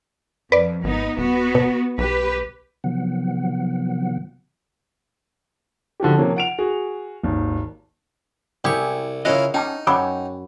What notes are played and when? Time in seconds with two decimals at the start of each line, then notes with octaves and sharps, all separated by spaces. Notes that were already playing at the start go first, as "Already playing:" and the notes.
0.52 F2 B4 D5
0.84 G#1 B3 D#4
1.17 D#1 B3 F#4
1.55 B2
1.98 B1 G4 B4
2.84 C3 D#3 F3 F#3 B3 F#5
6.00 D3 F3 F#4 G4
6.18 C3 F3 A#3 C#4
6.36 F#5 D7 F7
6.58 F#4 G#4
7.23 G#1 D#2
8.64 C2 E4 G4 G#4 C#6
9.25 C#3 C#4 E4 F4 A#4 D#5 F#5
9.54 C#4 D#4 G5 A5 D6
9.87 F#2 C#5 F#5 G5 B5 D6 E6